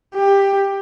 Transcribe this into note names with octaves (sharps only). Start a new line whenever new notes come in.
G4